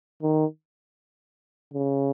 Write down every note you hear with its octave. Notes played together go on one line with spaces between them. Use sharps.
D#3
C#3